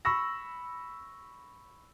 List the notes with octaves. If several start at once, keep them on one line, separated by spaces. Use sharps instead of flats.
B5 C#6 E6 A#6